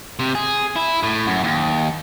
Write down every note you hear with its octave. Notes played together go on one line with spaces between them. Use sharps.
C3
G#4
E4
A2
F#2
D#2